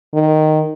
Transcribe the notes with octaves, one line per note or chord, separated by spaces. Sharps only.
D#3